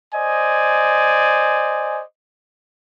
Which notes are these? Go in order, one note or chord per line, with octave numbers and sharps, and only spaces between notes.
C5 D5 D#5 G#5